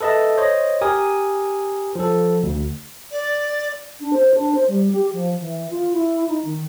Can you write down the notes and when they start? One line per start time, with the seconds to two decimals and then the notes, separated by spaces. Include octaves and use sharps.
0.01 A4 B4 D#5 E5 A5
0.38 C5 C#5 D#5
0.81 G4 A#4 G#5 D#6
1.95 F3 A4
2.43 D2
3.11 D5
4.00 D4
4.13 C5
4.34 D4
4.55 C5
4.68 G3
4.92 G4
5.13 F3
5.40 E3
5.70 F4
5.93 E4
6.28 D#4
6.45 D#3